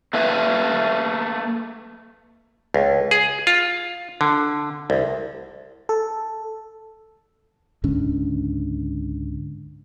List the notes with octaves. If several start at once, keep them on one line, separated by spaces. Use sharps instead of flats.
A3 A#3 B4 E5
C#2
G#4
F4
D3
C2
A4
C#2 G#2 D3 C#4